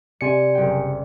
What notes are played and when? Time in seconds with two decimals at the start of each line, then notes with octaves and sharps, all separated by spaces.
0.21 C3 D5 G#5 C6 C#7
0.55 F#1 G5